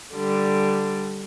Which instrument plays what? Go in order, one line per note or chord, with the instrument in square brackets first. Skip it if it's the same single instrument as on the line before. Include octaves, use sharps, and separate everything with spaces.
[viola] D3 G3